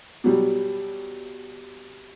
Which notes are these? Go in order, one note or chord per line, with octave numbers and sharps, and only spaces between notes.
B2 F#3 G3